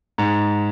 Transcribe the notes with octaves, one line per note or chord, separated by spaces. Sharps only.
G#2